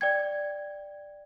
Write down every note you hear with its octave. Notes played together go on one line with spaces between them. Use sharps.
D5 G5 G#6